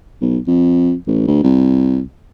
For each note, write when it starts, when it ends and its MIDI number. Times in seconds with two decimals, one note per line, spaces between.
0.21 0.38 35
0.47 0.93 41
1.07 1.26 33
1.27 1.40 38
1.43 2.00 36